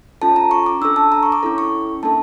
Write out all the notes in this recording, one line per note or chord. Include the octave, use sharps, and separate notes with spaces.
C#4 F4 A4 A5
A#5
C#6
D6
D4 A4 E6
A5
A#5
C#6
D6
C#4 E4 A4
C#6
A#3 D4 A4 A5